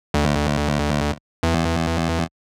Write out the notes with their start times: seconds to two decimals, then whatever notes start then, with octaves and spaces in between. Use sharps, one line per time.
0.14 D2
1.43 E2